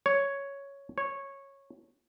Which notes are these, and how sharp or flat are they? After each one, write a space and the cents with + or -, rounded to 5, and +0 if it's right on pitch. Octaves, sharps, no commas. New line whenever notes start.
C#5 +5
C#5 -10